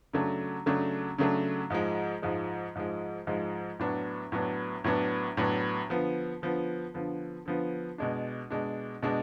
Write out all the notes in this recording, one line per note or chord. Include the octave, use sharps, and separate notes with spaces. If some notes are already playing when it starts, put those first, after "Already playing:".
C#3 F#3 A3 D4
C#3 F#3 A3 D4
C#3 F#3 A3 D4
G#2 F3 G#3
G#2 F3 G#3
G#2 F3 G#3
G#2 F3 G#3
A2 F#3 B3 D4
A2 F#3 B3 D4
A2 F#3 B3 D4
A2 F#3 B3 D4
D3 F3 B3
D3 F3 B3
D3 F3 B3
D3 F3 B3
B2 G#3 D4
B2 G#3 D4
B2 G#3 D4